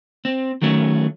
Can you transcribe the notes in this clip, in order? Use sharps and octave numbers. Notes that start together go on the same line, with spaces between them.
C4
D#3 F#3 A3 C#4